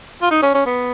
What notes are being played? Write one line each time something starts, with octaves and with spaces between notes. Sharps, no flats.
F4
D#4
C#4
C#4
B3